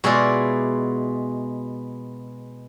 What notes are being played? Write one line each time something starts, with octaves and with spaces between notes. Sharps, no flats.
B2 G#3 E4 F4 G#4 D5